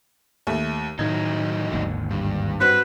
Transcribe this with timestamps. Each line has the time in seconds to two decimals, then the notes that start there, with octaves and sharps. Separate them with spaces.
0.47 D#2 A3
0.99 A2 D#3 F#3 A3 D#4 G#6
1.72 G#1 D#2 D3
2.11 G2
2.60 C4 F#4 B4 C5